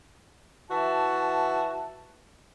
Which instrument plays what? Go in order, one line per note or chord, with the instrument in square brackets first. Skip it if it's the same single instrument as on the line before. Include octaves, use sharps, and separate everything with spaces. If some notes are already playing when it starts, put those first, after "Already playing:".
[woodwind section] E3 E5 A5 [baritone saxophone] F#4